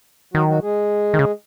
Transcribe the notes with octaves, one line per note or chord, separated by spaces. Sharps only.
D#3 F#3 F#4
F#3 F#4
G#3 G#4
D#3
C#3